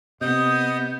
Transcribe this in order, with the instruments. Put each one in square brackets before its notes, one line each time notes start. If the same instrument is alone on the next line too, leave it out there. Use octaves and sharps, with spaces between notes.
[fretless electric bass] C3 [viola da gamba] B3 [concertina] D#5 D#6 [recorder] G6